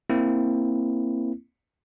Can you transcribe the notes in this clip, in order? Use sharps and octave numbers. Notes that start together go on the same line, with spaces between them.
A#3 C4 E4